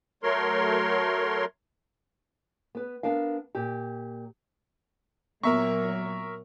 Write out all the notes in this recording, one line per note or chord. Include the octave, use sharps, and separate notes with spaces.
F#3 A3 A#4 C#5 C6
B3 B4
B3 D4 A#4 F5
A#2 G4
A#2 F#3 A#3 B3 A#4 E5 C#6